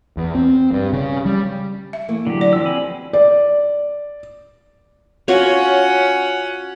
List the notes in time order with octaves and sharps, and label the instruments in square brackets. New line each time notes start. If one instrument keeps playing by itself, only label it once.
[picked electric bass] E2
C4
G2
C#3
G3
[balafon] E5
[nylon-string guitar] E3 A3 A#3
[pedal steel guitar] D3 F#3 G4
[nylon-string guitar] F#4 [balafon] D5
[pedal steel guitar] F3 E6
[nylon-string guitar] B3 [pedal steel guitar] C4 G#5 B5
[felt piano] D5
[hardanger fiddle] C#4 F#5 [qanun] F4 F#4 C#5